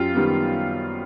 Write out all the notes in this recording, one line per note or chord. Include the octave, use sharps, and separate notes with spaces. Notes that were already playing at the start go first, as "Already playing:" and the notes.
Already playing: F#2 F4 G4
D#3 G3 B3